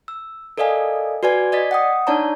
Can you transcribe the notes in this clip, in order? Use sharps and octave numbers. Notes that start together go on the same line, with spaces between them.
E6
A4 A#4 D5 D#5 F5 G#5
F#4 B4 D5 G#5 G#6
D5 D#5 A6 B6
F#5 G5 D#6
D4 D#4 C#5 D5 A5 A#5